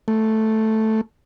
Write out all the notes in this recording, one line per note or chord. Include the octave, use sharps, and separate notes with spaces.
A3